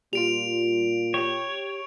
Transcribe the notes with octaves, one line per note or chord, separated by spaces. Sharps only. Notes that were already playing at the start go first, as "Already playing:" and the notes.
A#2 G3 F4 D7 F7
G4 C#5 G5